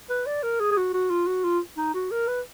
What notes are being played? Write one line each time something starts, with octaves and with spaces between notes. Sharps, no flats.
B4
D5
A#4
G#4
G#4
F#4
F#4
F4
F#4
F4
D#4
F#4
A#4
B4